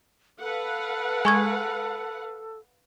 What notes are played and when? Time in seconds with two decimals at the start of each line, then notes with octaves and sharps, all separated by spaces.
0.40 A4 B4 F5 F#5
1.25 G#3 G#5 C#6 G#6